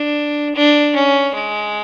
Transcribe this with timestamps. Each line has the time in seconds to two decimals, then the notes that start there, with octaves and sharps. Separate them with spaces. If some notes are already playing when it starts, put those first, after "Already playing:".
Already playing: D4
0.55 D4
0.95 C#4
1.34 G#3